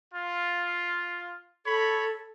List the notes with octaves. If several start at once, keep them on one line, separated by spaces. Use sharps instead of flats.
F4
A4 C#5 B5